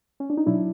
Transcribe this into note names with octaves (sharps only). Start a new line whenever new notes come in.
C#4
D4
D#4
B2 F#3 D4 E4